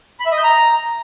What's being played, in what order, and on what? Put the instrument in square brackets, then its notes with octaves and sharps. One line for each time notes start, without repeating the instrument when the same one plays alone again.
[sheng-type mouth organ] B5
E5
D#5
G6
A#5